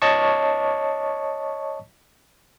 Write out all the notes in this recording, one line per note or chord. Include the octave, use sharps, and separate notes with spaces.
C#5 D#5 A5 C#6